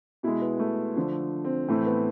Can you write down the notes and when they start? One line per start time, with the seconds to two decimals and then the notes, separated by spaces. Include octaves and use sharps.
0.23 B2 G#3 E4
0.42 B3
0.59 A3
0.96 D3 F3 A3
1.45 C4
1.68 A2 E3 A3 C4
1.87 B3